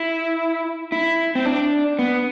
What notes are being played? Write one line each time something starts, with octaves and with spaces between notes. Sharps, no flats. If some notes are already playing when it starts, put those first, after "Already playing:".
Already playing: E4
E4
C4
D4
B3